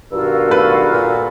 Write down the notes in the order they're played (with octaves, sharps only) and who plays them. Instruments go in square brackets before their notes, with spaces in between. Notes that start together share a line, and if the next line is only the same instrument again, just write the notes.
[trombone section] B1 D#3 A#4 [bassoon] G2 [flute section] F4 F#4 E6
[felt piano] A3 B4
[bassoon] A#2